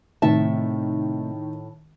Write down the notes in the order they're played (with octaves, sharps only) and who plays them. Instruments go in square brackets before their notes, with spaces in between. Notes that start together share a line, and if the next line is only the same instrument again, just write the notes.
[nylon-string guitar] A2 E5 A5 [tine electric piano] C3 A3 C4 [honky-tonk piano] D#3